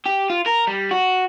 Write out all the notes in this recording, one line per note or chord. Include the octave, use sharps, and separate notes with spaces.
G4
F4
A#4
G3
F#4